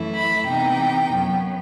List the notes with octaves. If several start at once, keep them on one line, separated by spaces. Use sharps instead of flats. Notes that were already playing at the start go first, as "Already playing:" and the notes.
Already playing: F#2 E3 A3 E4
B5
C3 E3 B3 D#4 G5
F#2 F#3 B3